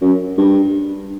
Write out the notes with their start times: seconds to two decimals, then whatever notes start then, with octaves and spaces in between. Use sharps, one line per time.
0.01 F#2
0.38 G2